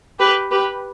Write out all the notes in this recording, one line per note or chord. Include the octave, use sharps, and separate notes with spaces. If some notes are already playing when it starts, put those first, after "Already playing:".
G4 B4
G4 B4